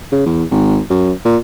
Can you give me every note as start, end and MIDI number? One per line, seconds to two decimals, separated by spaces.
0.12 0.26 49
0.26 0.44 40
0.51 0.78 32
0.90 1.11 42
1.25 1.37 46